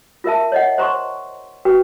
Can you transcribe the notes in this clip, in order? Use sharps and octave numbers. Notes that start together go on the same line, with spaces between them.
F4 A#4 E5 A5
C#5 D#5 F#5
C5 A#5 C6 C#6
F#4 B4 G5